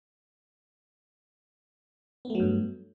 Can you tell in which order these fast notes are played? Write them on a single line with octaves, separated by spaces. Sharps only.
B3 A3 F#3 G2